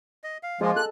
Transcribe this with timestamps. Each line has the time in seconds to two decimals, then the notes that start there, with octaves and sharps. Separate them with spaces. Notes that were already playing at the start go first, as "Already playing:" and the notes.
0.24 D#5
0.43 F5
0.61 F3 G#3 A#3 F4 G#4 D#5
0.76 A4 F#6